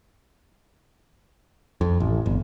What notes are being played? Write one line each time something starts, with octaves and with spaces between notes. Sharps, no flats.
F2
A1
G1